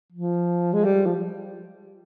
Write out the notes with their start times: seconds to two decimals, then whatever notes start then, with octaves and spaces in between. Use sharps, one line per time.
0.12 F3
0.73 G#3
0.85 G3
1.06 F3